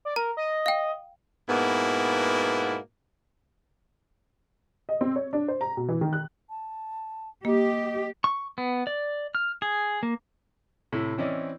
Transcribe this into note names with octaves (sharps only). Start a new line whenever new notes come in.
D5
A#4 A#5
D#5
F5 G5
G#2 B2 A#3 B3 E4
D#5
C4
C#5
D4
C5
A#5
B2
E3
D#3
F#6
A5
A#3 G4 D#5
C#6
B3
D5
F6
G#4
A#3
A2 C3 E4
E3 C4 C#4 E4 D5 D#5